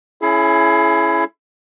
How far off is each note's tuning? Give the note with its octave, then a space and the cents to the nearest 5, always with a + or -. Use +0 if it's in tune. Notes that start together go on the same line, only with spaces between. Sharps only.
C#4 +0 E4 +15 G#4 +40